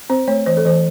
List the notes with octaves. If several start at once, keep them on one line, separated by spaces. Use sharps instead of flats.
C4 C5
A3 C#5
E3 C5
A4
E3 C5